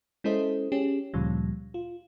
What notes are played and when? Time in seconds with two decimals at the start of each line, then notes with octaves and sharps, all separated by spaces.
0.24 G#3 C#4 E4 A4 C5 D#5
0.72 C#4 G4 G#4
1.14 D2 A#2 C#3 F3 G3
1.74 F4